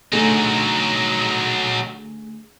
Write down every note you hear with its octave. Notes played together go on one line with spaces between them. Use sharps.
D3 F#3 A3 D#4 G#4